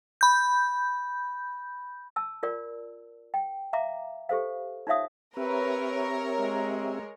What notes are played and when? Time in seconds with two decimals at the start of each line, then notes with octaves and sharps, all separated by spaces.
0.21 B5 G6
2.16 A5 E6
2.43 F4 A#4 D5
3.34 G5
3.73 E5 F5 A#5 D6
4.29 G4 A4 C5 F5
4.87 D#4 F4 C#5 E5 F5 D#6
5.37 C4 G4 A#4 B4 C#5 E5
6.37 G#3